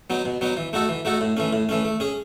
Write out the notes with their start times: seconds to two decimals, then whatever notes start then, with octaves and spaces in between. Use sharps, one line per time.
0.10 F#3 B3 D#4
0.25 B2
0.41 F#3 B3 D#4
0.57 E3
0.73 A3 D#4 F#4 A4
0.89 E3
1.05 A3 D#4 F#4 A4
1.21 A2
1.37 E3 A3 C#4
1.53 A2
1.69 E3 A3 C#4
1.85 A3
2.00 C#4 G#4